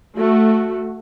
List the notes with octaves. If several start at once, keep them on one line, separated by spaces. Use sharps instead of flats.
A3 F#4